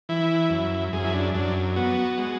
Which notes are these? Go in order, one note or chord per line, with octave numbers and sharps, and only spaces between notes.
E3 E4
F#2
F#2 G#4
E4
D4
F#2 D4
B3 F#4
G#3